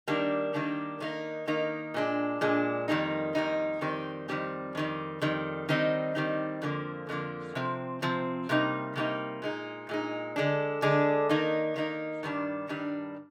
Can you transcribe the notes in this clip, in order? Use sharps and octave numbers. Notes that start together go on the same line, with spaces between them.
D#3 G3 A#3 D4
D#3 G3 A#3 D4
D#3 A#3 D#4
D#3 A#3 D#4
A#2 G#3 D4
A#2 G#3 D4
F2 D#3 G3 A#3 D#4
F2 D#3 G3 A#3 D#4
F2 D#3 G3 C4
F2 D#3 G3 C4
F2 D#3 G3
F2 D#3 G3
D#3 G3 C4 D#4
D#3 G3 C4 D#4
F2 D3 F3 A#3
F2 D3 F3 A#3
C3 F3 C4
C3 F3 C4
C3 G3 A#3 D#4
C3 G3 A#3 D#4
A#2 G#3 D#4
A#2 G#3 D#4
D3 G#3 D4
D3 G#3 D4
D#3 A#3 D#4
D#3 A#3 D#4
G2 D#3 G3 D4
G2 D#3 G3 D4